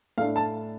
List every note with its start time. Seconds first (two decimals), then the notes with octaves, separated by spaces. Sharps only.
0.18 A2 A3 D4 F5
0.36 A5